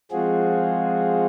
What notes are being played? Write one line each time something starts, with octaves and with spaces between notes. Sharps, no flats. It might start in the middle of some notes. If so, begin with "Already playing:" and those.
F3 G#3 C4 F4 F#4 G#4